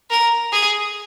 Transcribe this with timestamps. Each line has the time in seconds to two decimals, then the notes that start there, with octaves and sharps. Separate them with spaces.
0.10 A#4
0.53 G#4